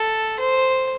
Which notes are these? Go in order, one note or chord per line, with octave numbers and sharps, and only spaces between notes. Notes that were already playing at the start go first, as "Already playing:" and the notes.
Already playing: A4
C5